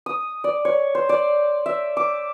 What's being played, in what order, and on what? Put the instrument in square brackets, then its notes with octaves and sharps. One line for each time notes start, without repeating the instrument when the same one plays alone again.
[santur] D#6
D5
C#5
C5
D5
E5
D6